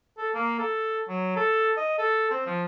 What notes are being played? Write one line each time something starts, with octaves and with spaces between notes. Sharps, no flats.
A4
A#3
A4
F#3
A4
D#5
A4
C4
F3